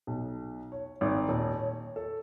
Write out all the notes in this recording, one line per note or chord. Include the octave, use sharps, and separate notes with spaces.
B1
C#5
G#1
D#1
C#5
A4